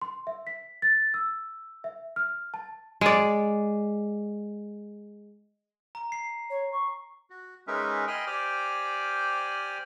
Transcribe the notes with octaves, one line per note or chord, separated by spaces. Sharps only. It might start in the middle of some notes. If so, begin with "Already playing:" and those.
C6
E5
B6
A6
E6
E5
F6
A5
G#3 D5
A#5
C7
C#5
C#6
F#4
G#3 C#4 D#4 A#4 B4 E5
D#5 G5 G#5 B5 C6 F6
G4 C5 D5 G5 G#5 F6